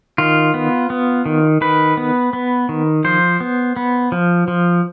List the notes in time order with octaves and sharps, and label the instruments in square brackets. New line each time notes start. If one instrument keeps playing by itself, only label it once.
[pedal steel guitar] D#3 F4
B3
B3
D#3
D#3 B4
B3
B3
D#3
F3 C5
B3
B3
F3
F3